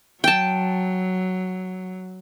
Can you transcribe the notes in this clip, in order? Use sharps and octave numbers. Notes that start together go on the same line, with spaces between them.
F#3 G5 A5